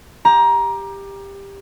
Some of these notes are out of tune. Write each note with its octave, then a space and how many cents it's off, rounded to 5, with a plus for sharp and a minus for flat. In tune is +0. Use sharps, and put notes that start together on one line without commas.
G4 +15 A#5 +20